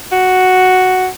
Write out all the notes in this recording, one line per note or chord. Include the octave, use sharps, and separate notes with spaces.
F#4